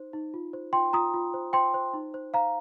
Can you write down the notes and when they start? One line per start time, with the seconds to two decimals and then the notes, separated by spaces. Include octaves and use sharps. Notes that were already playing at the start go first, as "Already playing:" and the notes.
Already playing: D#4 C5
0.13 D#4
0.34 F4
0.53 C5
0.73 F4 G5 C6
0.93 F4 A#5 D#6
1.14 F4
1.34 C5
1.53 C5 G5 C6
1.74 C5
1.93 D#4
2.14 C5
2.34 C5 F5 A#5